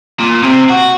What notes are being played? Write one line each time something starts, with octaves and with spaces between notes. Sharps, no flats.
A#2
C3 C4
F#4